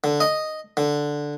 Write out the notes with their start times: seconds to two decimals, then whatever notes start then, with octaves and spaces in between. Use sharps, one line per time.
0.04 D3
0.20 D#5
0.77 D3